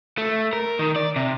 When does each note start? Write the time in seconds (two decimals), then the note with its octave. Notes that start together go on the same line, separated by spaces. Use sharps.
0.18 A3
0.53 A#4
0.79 D#3
0.96 D5
1.16 C3